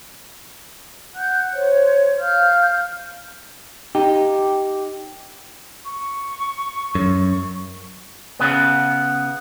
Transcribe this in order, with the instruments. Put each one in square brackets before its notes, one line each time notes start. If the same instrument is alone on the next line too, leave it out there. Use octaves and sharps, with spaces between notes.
[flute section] F#5 F#6 G6
C5 C#5
F5 F6 G6
[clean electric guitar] D#4 G4
[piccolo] C#6
[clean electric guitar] F#2
C#3 B3